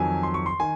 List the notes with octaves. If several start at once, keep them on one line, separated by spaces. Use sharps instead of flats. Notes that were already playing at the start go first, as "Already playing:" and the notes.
Already playing: F2 D#3 F#3 G#5
C6
C#6
C6
D#3 G#5